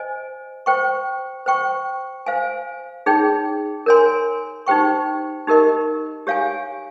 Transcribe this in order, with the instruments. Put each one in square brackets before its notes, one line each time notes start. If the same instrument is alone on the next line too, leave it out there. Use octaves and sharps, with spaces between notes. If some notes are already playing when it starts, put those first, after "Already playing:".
Already playing: [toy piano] C5 D#5 G#5
C5 G5 C#6
C5 G5 C#6
C5 F5 G#5
D#4 G#4 C#5 G5
A#4 C#5 G#5 C6
D#4 G4 C5 G5 C#6
D#4 G4 A#4 D#5
G4 C#5 F5 G#5